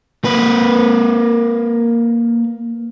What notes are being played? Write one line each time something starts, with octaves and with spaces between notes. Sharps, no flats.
A#3 B4